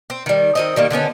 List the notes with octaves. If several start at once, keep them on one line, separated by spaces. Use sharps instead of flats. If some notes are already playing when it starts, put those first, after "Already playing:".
C4
D#3 G3
D#3 C4 D#5
D#3 G3 A#3
D3 D#3 B3 C#4